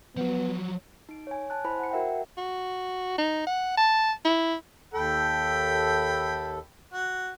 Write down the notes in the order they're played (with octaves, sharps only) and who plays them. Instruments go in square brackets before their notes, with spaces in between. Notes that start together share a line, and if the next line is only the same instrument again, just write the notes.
[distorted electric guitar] F3 F#3 [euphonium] B3
[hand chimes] D#4 D7
C#5 G#5
A5 F#6
E4 C5 G#5 B5
F#5 C#7
F#4 A#4 E5 F#5 G5
[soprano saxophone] F#4
D#4
F#5
A5
E4
[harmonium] D#2 A4 [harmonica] G5 B5
[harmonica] F#4